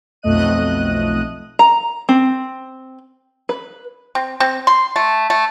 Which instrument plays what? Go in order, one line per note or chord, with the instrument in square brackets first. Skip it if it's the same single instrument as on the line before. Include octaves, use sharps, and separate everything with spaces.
[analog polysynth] B1 F2 A3 D#5 F#6 D#7
[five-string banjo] A#5
C4
B4
[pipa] C4
C4
C6
A3
A3